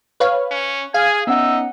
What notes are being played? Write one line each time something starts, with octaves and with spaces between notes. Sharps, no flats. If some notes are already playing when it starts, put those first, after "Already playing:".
B4 C#5 F5
C#4 F#6
G#4 F5 G#5
B3 C#4 D#4 E5 F#5